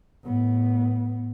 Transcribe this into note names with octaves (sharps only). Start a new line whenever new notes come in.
A2 B3